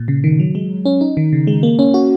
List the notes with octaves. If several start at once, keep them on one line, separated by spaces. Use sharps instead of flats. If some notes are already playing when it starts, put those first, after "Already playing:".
Already playing: A#2
C#3
D#3
F#3
G#3
C#4
D#4
D#3
C#3
G#3
A#3
C#4
F#4